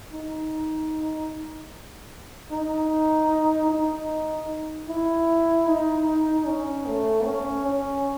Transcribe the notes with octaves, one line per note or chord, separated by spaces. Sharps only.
D#4
D#4
D#4
E4
D#4
C#4
A3
C#4
C#4